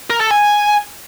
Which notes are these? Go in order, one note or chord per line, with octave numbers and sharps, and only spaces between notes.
A#4
A4
G#5